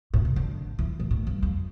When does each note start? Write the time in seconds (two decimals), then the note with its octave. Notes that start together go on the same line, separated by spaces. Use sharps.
0.14 A2
0.25 C3
0.36 D3
0.79 E3
0.99 A2
1.11 A2
1.27 G2
1.43 F2